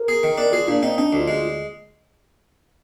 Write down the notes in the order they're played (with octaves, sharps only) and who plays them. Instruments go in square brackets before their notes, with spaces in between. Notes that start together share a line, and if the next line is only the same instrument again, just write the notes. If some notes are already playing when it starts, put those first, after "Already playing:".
Already playing: [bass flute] A#4
[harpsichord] G#4
D#3
D4
[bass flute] F4 [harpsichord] G#4
[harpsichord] A#2 [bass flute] D4
[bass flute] C4 [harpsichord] D#4
[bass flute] D4 [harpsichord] D#4
[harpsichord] D2
[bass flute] F4
[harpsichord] G#3